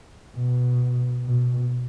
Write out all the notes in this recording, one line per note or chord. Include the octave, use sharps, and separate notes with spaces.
B2
B2